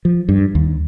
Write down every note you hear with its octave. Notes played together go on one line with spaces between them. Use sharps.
F3
G2
D#2